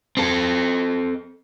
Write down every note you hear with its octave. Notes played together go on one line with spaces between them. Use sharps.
C4 A4